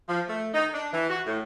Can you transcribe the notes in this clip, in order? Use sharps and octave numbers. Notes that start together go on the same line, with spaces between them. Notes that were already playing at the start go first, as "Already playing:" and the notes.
F3
A3
D#4
D4
E3
F#4
A2